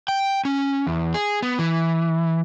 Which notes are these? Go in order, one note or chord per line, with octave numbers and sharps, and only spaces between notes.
G5
C#4
E2
G#4
B3
E3